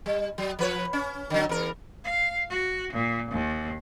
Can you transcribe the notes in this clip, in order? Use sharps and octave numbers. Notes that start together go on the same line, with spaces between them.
G3
F#3
F3 B4 C#5
C#4
D3 F#3
E2 A#4
F5
F#4
A#2
D#2